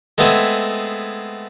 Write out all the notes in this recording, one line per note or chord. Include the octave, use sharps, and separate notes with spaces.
G#3 A3 B3 C4 G#4